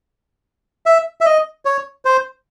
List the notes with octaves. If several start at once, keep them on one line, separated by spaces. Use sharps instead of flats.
E5
E5
D#5
C#5
C5